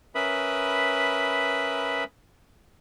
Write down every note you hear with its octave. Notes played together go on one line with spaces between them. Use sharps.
C#4 A#4 B4 E5 B5 D#6